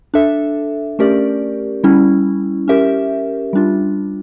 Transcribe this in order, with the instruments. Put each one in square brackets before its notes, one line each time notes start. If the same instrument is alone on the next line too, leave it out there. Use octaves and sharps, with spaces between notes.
[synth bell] D4 A4 E5
A3 C#4 G4 A#4 D5
G3 C#4 E4
C#4 G4 A#4 E5
G3 D4 F4